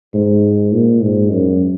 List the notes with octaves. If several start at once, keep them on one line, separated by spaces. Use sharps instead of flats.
G#2
A#2
G#2
F#2